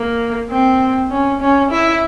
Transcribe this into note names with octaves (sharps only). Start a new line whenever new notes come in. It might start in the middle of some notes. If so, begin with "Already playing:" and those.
Already playing: A#3
C4
C#4
C#4
E4